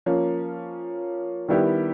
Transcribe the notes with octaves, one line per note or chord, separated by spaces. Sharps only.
F3 A#3 C#4
D#3 G3 B3 E4 G4